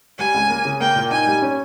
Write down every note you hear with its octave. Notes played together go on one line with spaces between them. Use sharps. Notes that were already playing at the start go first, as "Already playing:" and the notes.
G3 G#5
C#2
A#3
C#3
A#3 G5
A#2
D#4 G#5
G3
C#4